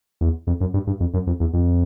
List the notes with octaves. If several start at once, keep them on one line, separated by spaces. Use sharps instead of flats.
E2
F2
F#2
G2
G2
F2
F#2
F2
E2
F2